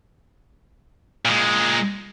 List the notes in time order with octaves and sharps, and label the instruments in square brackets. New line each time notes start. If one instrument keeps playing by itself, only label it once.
[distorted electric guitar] A#2 G#3